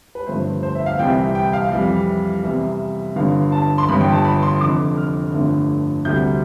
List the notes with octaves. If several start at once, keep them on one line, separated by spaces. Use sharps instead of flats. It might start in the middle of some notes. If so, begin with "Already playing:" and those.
B4
G1 G2 F3 A3 C5
C5
E5
F5
C2 C3 E3 G3 G5
G5
F5
F2 E3 G3
E2 C3 E3 G3 E5
G1 G2 D3 F5
A5
C6
G1 G2 E3 B5
G5
A5
B5
C6
F1 F2 D3 D6
F6
G1 G2 D3 F3 A3
D2 C3 G3 G6